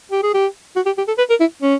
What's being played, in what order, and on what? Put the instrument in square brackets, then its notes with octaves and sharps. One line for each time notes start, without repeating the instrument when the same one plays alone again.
[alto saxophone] G4
G#4
G4
F#4
G4
G4
A4
B4
A#4
E4
C#4